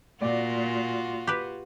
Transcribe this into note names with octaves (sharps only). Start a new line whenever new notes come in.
A#2 F4 F#4 D5
G4 B4